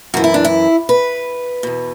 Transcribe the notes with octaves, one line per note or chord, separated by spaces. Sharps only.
F#2 E3 F#4
E4
D4
E4
B4
E2 B2